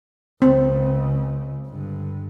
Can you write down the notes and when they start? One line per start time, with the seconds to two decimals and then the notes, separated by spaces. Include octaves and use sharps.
0.42 C#2 C#3 C4
1.67 G2 D3